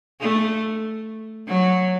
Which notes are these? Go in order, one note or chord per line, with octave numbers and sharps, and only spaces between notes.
A3
F#3